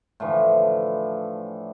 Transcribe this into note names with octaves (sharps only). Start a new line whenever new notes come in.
A2 D3 E3 F3